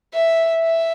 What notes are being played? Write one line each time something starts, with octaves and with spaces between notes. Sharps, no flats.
E5
E5